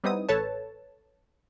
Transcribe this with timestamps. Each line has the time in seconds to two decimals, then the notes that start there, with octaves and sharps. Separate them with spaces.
0.04 G3 B3 C4 D#4 E4 D#6
0.29 A1 A4 B4 C#5 A5